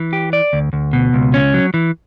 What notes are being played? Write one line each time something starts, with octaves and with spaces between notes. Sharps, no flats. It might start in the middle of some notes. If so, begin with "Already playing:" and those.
Already playing: E3
G4
D5
D2
D2
B2
C#2
C#4
F#3
E3